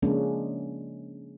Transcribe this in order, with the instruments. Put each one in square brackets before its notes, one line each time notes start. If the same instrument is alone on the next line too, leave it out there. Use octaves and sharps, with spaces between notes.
[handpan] C#3 F3 G#3 A#3 C#4 D4